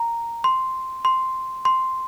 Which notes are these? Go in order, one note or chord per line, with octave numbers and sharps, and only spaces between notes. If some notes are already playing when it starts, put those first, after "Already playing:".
Already playing: A#5
C6
C6
C6